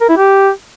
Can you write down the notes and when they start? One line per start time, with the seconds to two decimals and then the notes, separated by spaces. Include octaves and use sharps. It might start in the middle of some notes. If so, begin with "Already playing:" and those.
0.01 A#4
0.09 E4
0.17 G4